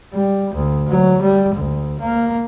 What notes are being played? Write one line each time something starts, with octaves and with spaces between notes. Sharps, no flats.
G3
D2
F#3
G3
D2
A#3